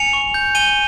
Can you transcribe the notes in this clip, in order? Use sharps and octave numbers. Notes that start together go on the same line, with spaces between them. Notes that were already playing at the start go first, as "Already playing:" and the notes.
Already playing: G#5 C#7 F7
C#6
G6
G#5 D#7 G7